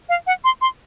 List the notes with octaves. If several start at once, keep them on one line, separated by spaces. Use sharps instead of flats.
F5
F#5
C6
C6